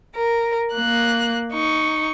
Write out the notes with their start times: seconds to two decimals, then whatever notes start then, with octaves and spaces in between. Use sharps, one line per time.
0.14 A#4
0.71 A#3 F#6
1.52 D#4 C#6